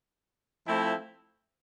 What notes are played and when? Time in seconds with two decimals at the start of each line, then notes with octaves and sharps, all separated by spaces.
0.67 F3 A3 C4 E4